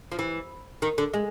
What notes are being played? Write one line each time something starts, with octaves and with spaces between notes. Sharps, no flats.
F3
E3
D#3
D3
G#3